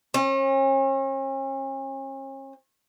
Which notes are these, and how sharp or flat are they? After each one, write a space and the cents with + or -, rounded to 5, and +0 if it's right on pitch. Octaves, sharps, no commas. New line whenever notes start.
C#4 -40